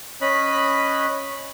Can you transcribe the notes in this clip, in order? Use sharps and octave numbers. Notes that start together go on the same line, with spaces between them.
C#4 D#5 B5 F#6